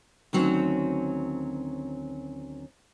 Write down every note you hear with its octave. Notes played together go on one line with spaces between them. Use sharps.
D2 D#3 F#3 C4 C#4